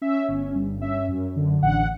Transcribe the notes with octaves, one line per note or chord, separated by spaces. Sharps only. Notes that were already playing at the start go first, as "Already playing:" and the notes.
C#4 E5
G1
G2
C#4 E5
F#2
D3
A1 F#5